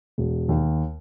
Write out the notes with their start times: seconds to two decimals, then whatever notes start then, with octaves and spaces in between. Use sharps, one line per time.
0.18 E1
0.49 D#2